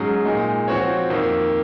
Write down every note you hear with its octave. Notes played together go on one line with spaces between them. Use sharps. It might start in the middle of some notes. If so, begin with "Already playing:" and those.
Already playing: G#2 F#3 C#4 G#4
A#2 G#3 D#4
F3 C4 F#4 C#5
F2 D#3 A#3